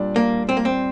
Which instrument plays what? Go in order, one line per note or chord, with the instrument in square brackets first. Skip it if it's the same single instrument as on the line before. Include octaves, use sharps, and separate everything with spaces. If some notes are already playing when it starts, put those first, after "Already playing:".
Already playing: [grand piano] A#2 G3 D4
[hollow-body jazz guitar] A#3
C4
A#3
C4